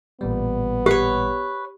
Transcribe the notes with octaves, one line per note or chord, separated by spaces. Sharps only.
A1 A#2 G3 B3
G4 B4 C#5